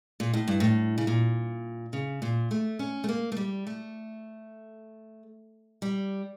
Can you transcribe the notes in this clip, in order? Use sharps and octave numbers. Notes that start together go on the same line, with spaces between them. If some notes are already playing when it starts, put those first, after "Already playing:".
A#2
A2
G2
A2
C#3
A#2
C#3
A#2
A3
C#4
A3
A#3
A3
G3
A3
G3